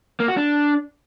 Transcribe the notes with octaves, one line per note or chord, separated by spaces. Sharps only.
A#3
F#4
D4